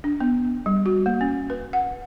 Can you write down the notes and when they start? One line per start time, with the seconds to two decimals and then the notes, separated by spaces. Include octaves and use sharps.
0.04 D4
0.20 B3
0.66 G3
0.86 F#4
1.06 A#3
1.21 C#4
1.50 B4
1.73 F#5